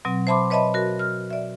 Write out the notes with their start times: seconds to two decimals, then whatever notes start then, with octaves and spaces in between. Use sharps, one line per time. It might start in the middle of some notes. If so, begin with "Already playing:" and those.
0.05 B2 F#3 C4
0.27 C5 E5 A5 B5 C6 D6
0.50 B4 C#5 D#5 E5 A5 B5
0.74 F#4 A#4
0.99 F6
1.31 D5 E5